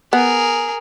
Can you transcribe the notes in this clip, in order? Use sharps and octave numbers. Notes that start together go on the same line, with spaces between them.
B3 G#4 A#4